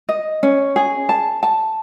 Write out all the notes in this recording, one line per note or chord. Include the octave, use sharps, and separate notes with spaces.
D#5
C#4
G#4
A5
A5